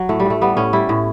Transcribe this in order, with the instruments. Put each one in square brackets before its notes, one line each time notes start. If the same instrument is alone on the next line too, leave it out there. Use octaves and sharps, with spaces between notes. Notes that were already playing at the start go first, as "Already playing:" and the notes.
Already playing: [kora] F#3
A2 A3
G3
A2 A3
G3 B3
A2 C#4
G3 E4
A2